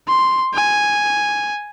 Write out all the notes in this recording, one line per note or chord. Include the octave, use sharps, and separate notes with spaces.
C6
G#5